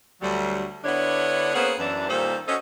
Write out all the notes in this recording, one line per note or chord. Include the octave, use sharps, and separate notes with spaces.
D2 F#3 G3
D3 B3 D4 E4 C#5
A#3 B3 C#4 G#4 B4 C5
F#2 E3 D4
A#2 D#3 G3 A4 C5
C#4 F#4 A4 C5 D#5